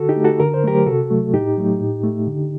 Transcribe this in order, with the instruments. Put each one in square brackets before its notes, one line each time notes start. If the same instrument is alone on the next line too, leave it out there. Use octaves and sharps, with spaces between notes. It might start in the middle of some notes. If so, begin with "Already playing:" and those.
Already playing: [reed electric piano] D3 F#4 A4
D#4 G4
A3
F#4 A4
D3 A#4
C5
F#3 A3 G4 A#4
C3 F#4 A4
F#3 A3
A2 D#4 G4
F#3 A3
A2
A3
D3